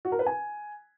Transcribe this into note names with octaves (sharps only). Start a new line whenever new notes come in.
F#4
A#4
B4
G#5